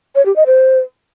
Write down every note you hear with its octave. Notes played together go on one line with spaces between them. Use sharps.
C#5
G4
D#5
C5